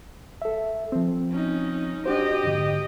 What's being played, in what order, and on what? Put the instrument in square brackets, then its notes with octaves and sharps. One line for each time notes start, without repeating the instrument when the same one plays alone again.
[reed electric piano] A4 E5
F3 C4
[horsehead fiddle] C#4 D#4
[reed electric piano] D4 F#4 C5 [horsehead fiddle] G4 D#5
[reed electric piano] F2 G#2 D3